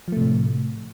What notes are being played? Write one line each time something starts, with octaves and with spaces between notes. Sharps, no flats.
A2 C3 F3 A3